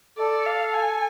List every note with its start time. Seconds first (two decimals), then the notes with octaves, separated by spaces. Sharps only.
0.17 A4 D5
0.46 F5
0.74 G#5